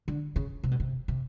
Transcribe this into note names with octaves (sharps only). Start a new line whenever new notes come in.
D3
C#3
C3
B2
C3
C3